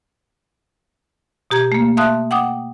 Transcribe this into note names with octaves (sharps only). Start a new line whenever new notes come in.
B2 G4 A#5 G#6
A3 A#3
E5 F5 A5 C6 D#6 F#6
F#5 G5 D6 D#6